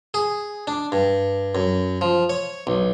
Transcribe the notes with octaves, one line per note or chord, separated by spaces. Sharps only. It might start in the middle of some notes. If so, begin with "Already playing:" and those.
G#4
D4
G2
F#2
F3
C#5
B1